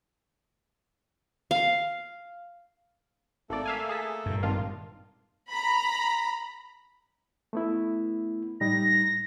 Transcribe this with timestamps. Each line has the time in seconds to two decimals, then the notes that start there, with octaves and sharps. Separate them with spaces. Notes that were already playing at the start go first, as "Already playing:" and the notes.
1.51 F5
3.50 G#1 A3 A#3 A4 D5
3.65 E5 F5 G#5
3.89 G#4 A5 B6
4.26 G2 A#2
4.43 G#1 D#3 D4 F4
5.49 A#5 B5
7.53 A3 B3 E4
8.61 A2 G3 D#4 A#6